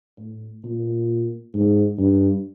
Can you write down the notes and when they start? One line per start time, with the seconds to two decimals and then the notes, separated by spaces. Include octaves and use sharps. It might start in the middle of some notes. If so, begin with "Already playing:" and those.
0.19 A2
0.64 A#2
1.54 G#2
1.98 G2